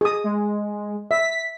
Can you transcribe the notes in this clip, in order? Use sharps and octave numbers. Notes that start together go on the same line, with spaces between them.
G#4 D#6
G#3
E5 B6